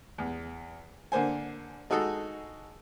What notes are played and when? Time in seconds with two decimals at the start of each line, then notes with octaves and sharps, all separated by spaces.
0.18 E2
1.12 D3 A#3 C5 G#5
1.90 G#3 D#4 F#4 G#4 A4